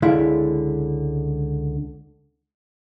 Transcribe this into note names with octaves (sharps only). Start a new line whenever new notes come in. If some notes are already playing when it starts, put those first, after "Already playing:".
C#2 D3 G#3 E4 F5